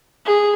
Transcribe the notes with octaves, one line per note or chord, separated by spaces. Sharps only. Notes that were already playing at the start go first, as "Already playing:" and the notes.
G#4